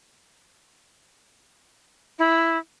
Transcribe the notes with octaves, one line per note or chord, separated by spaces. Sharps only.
E4